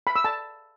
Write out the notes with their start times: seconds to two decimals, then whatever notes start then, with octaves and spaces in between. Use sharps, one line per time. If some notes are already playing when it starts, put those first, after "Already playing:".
0.07 B5
0.16 E6
0.24 A5